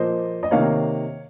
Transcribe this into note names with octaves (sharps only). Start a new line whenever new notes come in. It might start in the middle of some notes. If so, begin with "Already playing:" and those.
Already playing: A#2 F3 A#3 C5 D#5
D#5
C3 D#3 A#3 C#5 F5